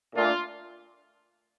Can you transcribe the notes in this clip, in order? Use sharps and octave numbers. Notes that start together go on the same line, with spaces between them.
A#2 A3 D4 F4